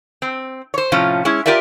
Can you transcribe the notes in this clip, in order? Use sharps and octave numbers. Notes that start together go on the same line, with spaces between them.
C4
C5 C#5
A2 C3 F3 C#4 F4
G#3 C#4 E4
F4 G4 A#4 D5 E5